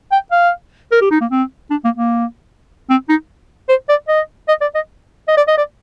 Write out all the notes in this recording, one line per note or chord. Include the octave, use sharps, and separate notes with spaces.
G5
F5
A#4
G4
D#4
A#3
C4
D4
A#3
A#3
C4
D#4
C5
D5
D#5
D#5
D5
D#5
D#5
D5
D#5
D5